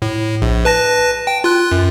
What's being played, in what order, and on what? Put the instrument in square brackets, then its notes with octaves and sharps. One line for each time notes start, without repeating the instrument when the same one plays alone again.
[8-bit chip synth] A2
A#1
B4 A5 A#6
G5
F4 F#6
F#2